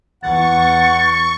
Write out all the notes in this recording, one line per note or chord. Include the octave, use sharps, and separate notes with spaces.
E2 F#5 C#6 A6